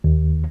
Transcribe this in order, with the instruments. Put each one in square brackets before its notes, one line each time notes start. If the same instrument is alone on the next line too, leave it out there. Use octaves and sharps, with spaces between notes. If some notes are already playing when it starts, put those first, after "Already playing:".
[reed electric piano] D#2